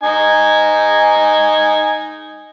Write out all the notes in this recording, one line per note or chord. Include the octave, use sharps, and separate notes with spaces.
D#4 G#5